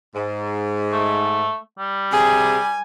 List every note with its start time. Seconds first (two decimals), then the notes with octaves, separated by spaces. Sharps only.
0.15 G#2
0.92 A3
1.78 G3
2.12 C3 G#4 G#5